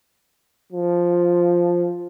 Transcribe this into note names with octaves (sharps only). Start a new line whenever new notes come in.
F3